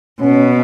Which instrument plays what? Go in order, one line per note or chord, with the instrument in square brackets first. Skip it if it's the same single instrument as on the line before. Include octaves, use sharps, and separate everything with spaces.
[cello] B2 [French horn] C#4